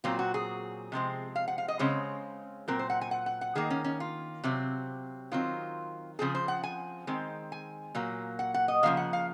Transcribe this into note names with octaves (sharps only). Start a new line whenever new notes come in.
A#2 F#3 C4 F4
F#4
G#4
C3 F3 G#3 C4
F5
F#5
F5
D#5
C#3 G#3 C4 C#5
A#2 F#3 C4 A#4
C5
F#5
G#5
F#5
F#5
F#5
D#3 A#3 G#4
C#4
C#4
F4
C3 F#3 C4
D#3 F#3 C4 F4
C#3 F3 C4 G#4
C5
F#5
G#5
D#3 G#3 C4
G#5
A#2 F#3 A#3
F#5
F#5
D#5
C#3 F3 A#3 F5
F#5
F5